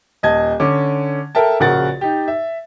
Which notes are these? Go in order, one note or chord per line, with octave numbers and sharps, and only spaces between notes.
D#1 D#5 A5 G#6
D3 C#4 D6
A4 A#4 E5 G5 A5
A#1 C#3 F#4 A#4 F#5 A6
D#4 G4
E5